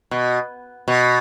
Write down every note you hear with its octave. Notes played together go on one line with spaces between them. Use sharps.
B2
B2